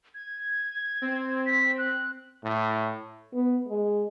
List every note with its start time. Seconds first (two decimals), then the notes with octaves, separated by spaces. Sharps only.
0.15 G#6
1.02 C4
1.46 B6
1.78 F#6
2.44 A2
3.34 B3
3.68 G#3